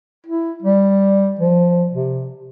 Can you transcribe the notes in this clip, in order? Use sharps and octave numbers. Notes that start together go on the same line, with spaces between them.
E4
G3
F3
C3